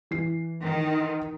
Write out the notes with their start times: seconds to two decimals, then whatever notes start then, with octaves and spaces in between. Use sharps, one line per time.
0.11 E3 C7
0.64 D#3